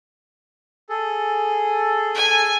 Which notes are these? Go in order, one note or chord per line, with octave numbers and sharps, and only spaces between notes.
G#4 A4
G#5